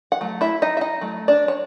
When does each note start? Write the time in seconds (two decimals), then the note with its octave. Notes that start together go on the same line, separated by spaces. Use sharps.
0.12 F#5
0.21 F#3 A3
0.41 E4 E5
0.62 D#4 D#5
0.77 E5
0.81 D#4 D#5
1.01 F#3 A3
1.28 D4 D5
1.48 C#5